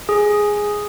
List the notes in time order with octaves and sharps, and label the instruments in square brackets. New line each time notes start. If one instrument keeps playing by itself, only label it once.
[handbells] G#4